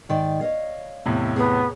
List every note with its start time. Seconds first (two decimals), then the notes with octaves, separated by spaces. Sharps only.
0.09 G#2 D#3 D5
0.41 C#5 D#5 F5
1.06 E2 A2 C3
1.36 B3 G#4 C#5